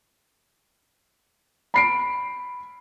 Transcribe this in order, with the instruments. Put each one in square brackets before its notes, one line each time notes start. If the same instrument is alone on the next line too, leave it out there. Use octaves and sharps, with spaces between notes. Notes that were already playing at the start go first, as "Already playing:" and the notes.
[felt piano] B5 C7 D7